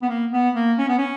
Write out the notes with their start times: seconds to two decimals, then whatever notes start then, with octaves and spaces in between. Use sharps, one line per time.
0.02 B3
0.09 A#3
0.33 B3
0.56 A#3
0.79 C#4
0.88 B3
0.98 C#4